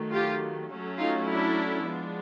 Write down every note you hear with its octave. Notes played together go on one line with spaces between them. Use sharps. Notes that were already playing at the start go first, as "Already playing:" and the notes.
Already playing: D#3 F#3 A3
F4 G4
F#3 A3 C#4
D#4 F4
D4 E4
F3 G#3 B3 D4